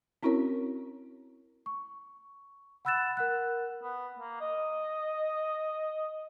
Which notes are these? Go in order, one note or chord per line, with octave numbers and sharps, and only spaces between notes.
C4 C#4 E4 F#4 A#4 C#5
C#6
F#5 B5 E6 F#6 A6 E7
A#4 F#5 F#6
B3
A#3
D#5